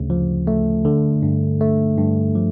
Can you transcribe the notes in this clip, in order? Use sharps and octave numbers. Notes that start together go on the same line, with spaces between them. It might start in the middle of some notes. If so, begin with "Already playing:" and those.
Already playing: D2 C#3
F3
A3
D3
G2
A3
G2
F3